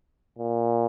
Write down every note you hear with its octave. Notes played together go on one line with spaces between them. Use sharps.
A#2